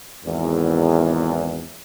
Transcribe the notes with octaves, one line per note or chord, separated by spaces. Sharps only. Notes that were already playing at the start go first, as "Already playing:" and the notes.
G#1 E2